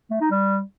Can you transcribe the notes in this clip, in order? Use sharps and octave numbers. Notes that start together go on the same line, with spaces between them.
A3
D#4
G3